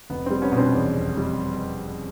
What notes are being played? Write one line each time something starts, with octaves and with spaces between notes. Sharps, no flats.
F1 B3
G3 C4
B3 C#4
B2
C4 D4
E2
F1
G3